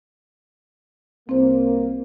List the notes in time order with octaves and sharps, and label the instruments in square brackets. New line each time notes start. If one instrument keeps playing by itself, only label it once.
[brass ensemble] C2 A#3 [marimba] C4 C5